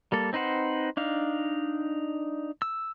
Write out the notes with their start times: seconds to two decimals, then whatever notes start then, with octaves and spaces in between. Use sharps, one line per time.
0.12 G3 A#3 A4
0.33 C4 D#4 B4 C5 F#5
0.97 D4 D#4 F5
2.62 E6